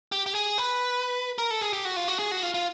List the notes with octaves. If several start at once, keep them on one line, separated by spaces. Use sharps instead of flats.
G4
G4
G#4
B4
A#4
A4
G#4
G4
F#4
F4
F#4
G#4
F#4
F4
F4